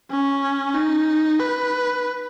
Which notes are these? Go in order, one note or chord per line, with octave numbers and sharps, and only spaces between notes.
C#4
D#4
B4